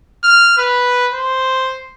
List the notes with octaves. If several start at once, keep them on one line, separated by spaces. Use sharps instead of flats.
F6
B4
C5